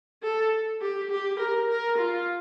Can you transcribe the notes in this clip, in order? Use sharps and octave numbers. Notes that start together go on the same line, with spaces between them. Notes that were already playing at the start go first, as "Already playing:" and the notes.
A4
G4
G4
A#4
A#4
F4